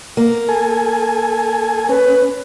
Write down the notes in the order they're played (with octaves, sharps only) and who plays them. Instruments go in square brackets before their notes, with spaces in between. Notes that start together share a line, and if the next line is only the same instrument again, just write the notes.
[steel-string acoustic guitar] A#3
[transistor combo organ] A4 G#5
[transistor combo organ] C#4 [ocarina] B4